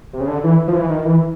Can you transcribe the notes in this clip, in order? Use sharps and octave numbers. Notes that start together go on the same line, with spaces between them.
C3
C#3
D3
E3
F3
E3
D#3
E3